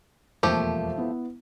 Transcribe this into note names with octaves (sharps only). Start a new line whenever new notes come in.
E1 F2 F3 A3 A#3 G4
B3 E4